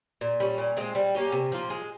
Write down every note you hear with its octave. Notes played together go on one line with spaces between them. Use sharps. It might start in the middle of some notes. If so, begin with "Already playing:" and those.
A#2
G3 C#4
A#2
G#3 C4 F4
G3
A#3 C#4 G4
C3
F3 A#3 F4
G#3